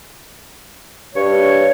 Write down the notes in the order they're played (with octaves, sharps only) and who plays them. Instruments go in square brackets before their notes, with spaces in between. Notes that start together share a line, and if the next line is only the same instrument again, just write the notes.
[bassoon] G2 [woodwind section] C#5